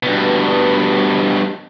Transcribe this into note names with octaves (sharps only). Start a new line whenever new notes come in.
G2 B2